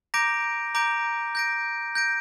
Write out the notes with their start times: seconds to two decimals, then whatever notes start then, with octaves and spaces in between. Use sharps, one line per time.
0.14 A#5 D6 G6 A#6 D7
0.75 A#5 D6 G6 A#6 D7
1.35 G6 A#6 D7
1.95 G6 A#6 D7